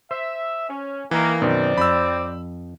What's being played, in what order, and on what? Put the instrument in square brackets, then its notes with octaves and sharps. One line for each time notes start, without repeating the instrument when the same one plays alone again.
[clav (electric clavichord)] C5 [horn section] E5
[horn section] C#4
[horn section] D#3 A#3 [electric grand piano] E3
[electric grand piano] F#2 [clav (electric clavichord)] B2 D#3 [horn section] C4 D5
[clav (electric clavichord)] F2 [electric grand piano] B5 E6